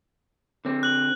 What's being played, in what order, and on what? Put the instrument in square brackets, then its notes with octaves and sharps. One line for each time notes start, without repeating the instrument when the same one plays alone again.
[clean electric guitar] D3 C4
[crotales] F#6 F#7